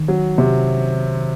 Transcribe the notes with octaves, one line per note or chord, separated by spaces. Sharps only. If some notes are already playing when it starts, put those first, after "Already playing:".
Already playing: D#3
F#3
C3